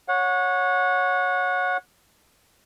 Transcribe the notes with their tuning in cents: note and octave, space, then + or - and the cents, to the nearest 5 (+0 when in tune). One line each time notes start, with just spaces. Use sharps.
C#5 +0 F#5 -25